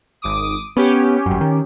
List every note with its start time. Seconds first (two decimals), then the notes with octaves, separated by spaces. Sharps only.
0.22 G#1 D6 D#6
0.77 B3 C#4 G4
1.26 G1 F#2
1.41 D#3